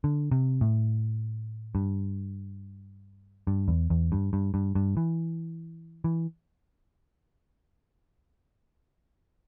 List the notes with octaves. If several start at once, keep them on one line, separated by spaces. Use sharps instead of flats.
D3
C3
A2
G2
G2
E2
E2
G2
G2
G2
G2
E3
E3